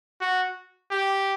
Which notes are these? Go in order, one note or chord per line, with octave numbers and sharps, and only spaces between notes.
F#4
G4